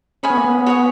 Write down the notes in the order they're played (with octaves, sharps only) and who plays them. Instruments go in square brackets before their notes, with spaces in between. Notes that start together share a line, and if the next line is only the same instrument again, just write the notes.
[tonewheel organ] C#4 [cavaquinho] C#5 G#5 B5 D#6
[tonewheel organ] B3
A#3
B3
[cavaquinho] F#4 C#5 G#5 D#6